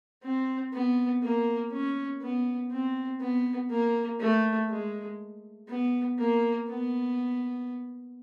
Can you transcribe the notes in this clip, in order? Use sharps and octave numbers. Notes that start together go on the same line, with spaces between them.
C4
B3
A#3
C#4
B3
C4
B3
A#3
A3
G#3
B3
A#3
B3